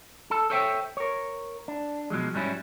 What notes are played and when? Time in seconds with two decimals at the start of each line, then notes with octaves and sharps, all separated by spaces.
0.31 A4 A5
0.50 A4 C5 C#5 E5 G5
0.97 A#4 C#5
1.68 D4
2.10 B2 F3 F#3 G#3
2.34 G#2 F#3 G3 C#4 E4